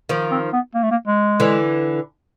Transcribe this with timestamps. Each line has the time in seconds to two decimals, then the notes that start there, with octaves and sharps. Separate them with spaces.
0.09 D#3 F3
0.31 C4
0.53 B3
0.75 A#3
0.83 A3
0.91 A#3
1.07 G#3
1.40 D3 E3